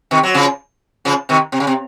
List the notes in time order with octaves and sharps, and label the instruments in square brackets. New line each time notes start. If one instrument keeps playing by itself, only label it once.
[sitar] C3 D#3
F#3
C#3 F3
C#3 F3
C3 D#3
C3
C#3
C3